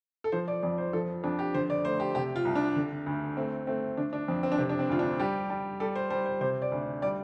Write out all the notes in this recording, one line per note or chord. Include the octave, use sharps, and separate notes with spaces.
A4
F3 C5
D5
F2 D5
C5
F3 A4
F2 D4
G4
D3 C5
D5
A3 C5
G4
C3 G4
F4
C2
D4
D3
D2
A3 C4
A3 C4
D3 D4
D4
F2 C4
C4
D4
C3 C4
D4
C4
D2 F4
D4
G3 G4
G3
G3 A4
C5
G3 C5
C5
C3 C5
D5
D2
G3 D5